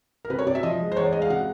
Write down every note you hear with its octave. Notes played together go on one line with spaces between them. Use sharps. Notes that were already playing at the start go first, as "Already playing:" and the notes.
A#4
C3 B4
C#5
C3 D5
E5
F3 D#5
G#3
C5
E2 C#5
D5
G#3 D#5
F5
C3 F#5